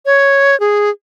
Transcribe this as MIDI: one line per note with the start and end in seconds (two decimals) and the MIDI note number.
0.06 0.58 73
0.60 0.90 68